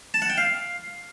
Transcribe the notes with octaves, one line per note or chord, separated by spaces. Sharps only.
A5
F#5
G5
F5